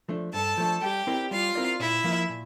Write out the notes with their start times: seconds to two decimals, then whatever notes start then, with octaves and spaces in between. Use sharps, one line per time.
0.09 F3 A3 D4
0.33 G2 A4 A5
0.58 F3 A3 D4
0.82 G3 G4 G5
1.07 C4 E4 A#4 D5
1.31 G3 F4 F5
1.55 C4 E4 A#4 D5
1.80 A#2 E4 E5
2.04 F3 A#3 F4
2.29 A#2